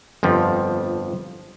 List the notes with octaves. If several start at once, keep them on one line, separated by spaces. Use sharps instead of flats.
G1 F2 F3